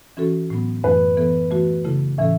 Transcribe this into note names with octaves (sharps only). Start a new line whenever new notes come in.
E3 C#4 F#4 A4
A2 F#3 B3
F#2 E3 A3 B4
E3 B3 A4
E3 A3 F#4
C#3 A3 E4 A4
A2 E3 C#4 A4 E5